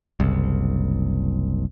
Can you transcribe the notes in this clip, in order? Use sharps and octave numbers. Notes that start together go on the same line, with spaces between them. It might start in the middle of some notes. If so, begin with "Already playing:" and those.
F#1 C2